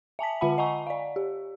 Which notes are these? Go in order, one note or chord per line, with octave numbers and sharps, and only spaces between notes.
E5 G#5 A5 B6
D3 F4 E5 F#5 A5 B5
D#5 F#5 G#5 A#5 C#6
D5 F5
G4